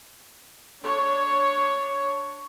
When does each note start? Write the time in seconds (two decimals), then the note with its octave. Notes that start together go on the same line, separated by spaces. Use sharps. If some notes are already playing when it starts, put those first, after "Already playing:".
0.81 D4 C#5